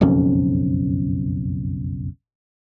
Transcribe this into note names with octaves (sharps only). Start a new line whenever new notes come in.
F#1 B1 F2 C#4